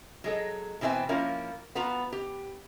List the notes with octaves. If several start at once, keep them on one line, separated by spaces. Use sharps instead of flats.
F#3 G#3 A4
B2 E3 C4 E5 G#5
F3 A#3 C#4 E4 F4 A#4
B3 F4 F#4 B4 A#5
G4